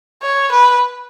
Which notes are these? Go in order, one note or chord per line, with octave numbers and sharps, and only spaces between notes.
C#5
B4